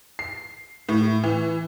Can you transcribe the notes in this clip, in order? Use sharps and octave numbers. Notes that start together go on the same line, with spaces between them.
C7
A2
E3